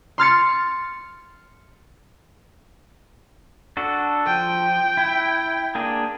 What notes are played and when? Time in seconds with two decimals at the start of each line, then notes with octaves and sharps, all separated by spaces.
0.18 C6 F6 A6 C#7
3.77 D4 F#4 A4
4.27 F3 G5
4.97 E4
5.75 A#3 D4 G#4